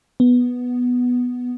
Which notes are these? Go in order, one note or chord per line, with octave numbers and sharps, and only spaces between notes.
B3